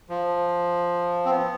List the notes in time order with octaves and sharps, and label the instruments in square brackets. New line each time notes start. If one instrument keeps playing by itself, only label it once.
[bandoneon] F3
C4
B3